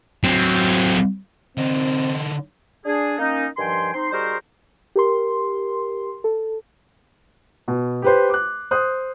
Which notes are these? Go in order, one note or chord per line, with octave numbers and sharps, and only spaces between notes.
F#3 C4
D3 C4 D#4
D4 G#4
A#3 C#4 D#4
G2 D#3 F3 G5 G#5 C6
C4 D#4 C6
G3 D#4 F#4 G#4 A#4 C5
G4 A#4 C6
A4
B2
G4 B4 C5
D6 F#6
C5 D#6 F#6